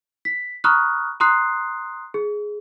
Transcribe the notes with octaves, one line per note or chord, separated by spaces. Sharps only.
B6
A#5 B5 C#6 D#6 F6 F#6
A#5 C6 D#6 F#6 C7
G#4